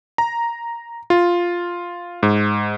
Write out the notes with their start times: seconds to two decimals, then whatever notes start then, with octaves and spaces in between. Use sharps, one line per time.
0.18 A#5
1.10 F4
2.23 G#2